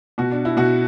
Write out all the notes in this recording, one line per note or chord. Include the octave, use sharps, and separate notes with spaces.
B2 F#4
D4
E4
B2 F#4